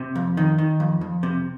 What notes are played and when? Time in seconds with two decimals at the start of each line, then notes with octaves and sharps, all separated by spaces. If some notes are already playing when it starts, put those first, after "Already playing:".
Already playing: C3
0.15 F2
0.37 D#3
0.58 D#3
0.80 F2
1.01 F2
1.23 C3